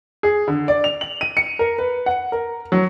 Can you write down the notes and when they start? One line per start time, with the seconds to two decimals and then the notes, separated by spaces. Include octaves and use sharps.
0.23 G#4
0.48 D3
0.68 D5
0.84 F7
1.01 F#7
1.21 D#7
1.37 C#7
1.59 A#4
1.78 B4
2.06 F#5
2.32 A#4
2.72 F#3